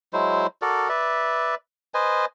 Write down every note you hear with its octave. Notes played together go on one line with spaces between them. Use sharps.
F#3 G#3 E4 C5
F#4 A4 A#4 D5
B4 D5 E5
B4 C5 D#5 G#5